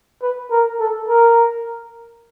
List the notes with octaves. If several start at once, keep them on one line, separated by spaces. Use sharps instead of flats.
B4
A#4
A4
A#4